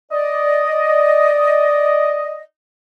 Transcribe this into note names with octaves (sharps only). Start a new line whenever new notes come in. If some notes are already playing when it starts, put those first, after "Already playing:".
D5 D#5